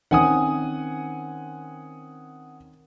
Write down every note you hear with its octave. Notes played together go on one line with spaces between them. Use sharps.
D#3 C4 C#4 F#5 G#5 D#6